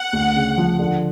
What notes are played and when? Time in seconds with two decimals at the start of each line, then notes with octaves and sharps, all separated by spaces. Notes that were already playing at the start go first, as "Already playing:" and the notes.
Already playing: F#5
0.13 D2
0.35 C#3
0.58 F3
0.79 D3